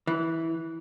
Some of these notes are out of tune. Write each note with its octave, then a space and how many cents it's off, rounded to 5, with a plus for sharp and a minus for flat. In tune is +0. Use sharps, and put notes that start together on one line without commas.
E3 -10